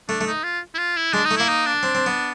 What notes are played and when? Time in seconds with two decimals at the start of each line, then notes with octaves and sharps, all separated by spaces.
0.08 A3 D4
0.21 A3
0.27 D#4
0.44 F4
0.74 E4
0.78 F4
0.97 E4
1.13 G#3 D4
1.25 D#4
1.31 A3
1.37 A#3 E4
1.49 D#4
1.66 D4
1.83 C4
1.95 C4
2.06 B3